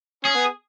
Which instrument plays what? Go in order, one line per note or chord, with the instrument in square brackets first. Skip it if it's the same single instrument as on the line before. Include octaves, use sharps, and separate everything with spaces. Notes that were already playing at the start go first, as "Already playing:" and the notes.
[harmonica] C#4 [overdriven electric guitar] G#4
[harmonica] B3